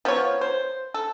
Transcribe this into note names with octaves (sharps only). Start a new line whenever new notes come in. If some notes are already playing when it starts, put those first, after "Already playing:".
F3 B3 F4 C#5
C5
A4